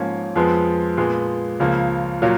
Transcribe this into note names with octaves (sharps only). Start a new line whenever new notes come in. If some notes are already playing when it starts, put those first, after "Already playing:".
Already playing: G#2 F3 A#3 C#4
F2 F3 G#3 B3
A#2 G#3 B3
C#2 C#3 F3 A#3
A#2 F#3 A#3